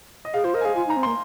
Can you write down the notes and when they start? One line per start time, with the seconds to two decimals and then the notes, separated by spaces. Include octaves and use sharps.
0.25 D#5
0.34 G#4 F5
0.44 F4 C5
0.54 A#4 D#5
0.61 G#5
0.65 G#4 F5
0.76 F4 G#5
0.87 D#4 A#5
0.97 C4
1.03 A#3 C6